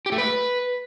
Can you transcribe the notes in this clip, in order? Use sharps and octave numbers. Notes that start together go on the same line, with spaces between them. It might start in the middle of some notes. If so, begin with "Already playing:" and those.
G4
A3
B4